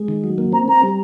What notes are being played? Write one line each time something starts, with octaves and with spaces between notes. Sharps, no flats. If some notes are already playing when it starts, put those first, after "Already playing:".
Already playing: G#3
D#3
F#3
A#3
C4 A#5
C4 A#5
G3